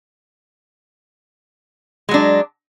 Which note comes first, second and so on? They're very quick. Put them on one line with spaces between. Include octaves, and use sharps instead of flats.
G#3 F#3 D4